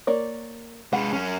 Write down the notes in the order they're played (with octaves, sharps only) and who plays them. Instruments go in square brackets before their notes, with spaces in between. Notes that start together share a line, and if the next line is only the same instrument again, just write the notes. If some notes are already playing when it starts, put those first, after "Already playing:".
[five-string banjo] A#3 C#5 D5
[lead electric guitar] G#3 B4 [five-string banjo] F#5
[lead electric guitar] F#3 C#4